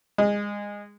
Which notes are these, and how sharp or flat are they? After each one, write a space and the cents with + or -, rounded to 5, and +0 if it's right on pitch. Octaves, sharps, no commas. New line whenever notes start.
G#3 -20